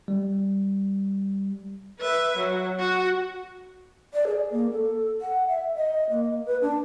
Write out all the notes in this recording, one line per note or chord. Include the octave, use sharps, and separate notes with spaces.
G3
B4 E5
F#3
F#4
D5
G#4
A#3
A4
F#5
E5
D#5
A#3
B4
D4